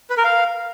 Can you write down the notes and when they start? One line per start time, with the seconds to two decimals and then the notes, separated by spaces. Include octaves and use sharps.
0.10 B4
0.17 A#4
0.24 F5